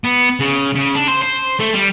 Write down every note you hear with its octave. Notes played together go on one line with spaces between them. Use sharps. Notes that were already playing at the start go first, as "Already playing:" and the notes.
B3
C#3
C#3
D4
C5
C5
A3
G3